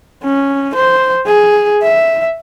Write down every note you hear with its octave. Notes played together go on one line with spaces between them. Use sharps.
C#4
C5
G#4
E5